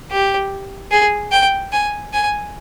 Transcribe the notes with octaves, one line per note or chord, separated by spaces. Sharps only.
G4
G#4
G5
G#5
G#5